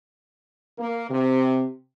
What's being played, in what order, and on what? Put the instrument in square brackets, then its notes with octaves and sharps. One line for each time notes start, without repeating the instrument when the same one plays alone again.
[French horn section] A#3
C3